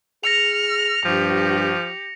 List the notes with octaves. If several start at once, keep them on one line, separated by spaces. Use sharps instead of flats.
G#4 F6 A#6 C#7 F7
G2 F3 G4